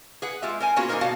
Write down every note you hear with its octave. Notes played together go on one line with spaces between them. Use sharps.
G#4 B4 F#5
G#3 F4 G4 E5
A#4 C5 G#5
A#3 B3 C#4 F4 F#4 G#4
E3 A#3 C#4 D#4 A#4 C5
B2 G3 F#4 F5 A5